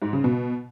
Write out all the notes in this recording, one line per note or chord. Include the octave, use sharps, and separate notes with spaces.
G#2
C#3
B2